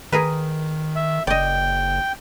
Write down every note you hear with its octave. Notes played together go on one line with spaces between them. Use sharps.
D#3 G#4 A#4 B4
E5
F#1 D5 D#5 G5